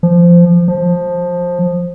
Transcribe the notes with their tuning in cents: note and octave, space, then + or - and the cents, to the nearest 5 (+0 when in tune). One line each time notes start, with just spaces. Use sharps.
F3 -15
F3 +15